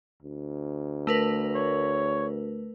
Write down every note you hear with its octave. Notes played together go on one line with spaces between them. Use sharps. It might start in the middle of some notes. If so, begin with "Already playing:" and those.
D2
A3 A#4 B4
C#5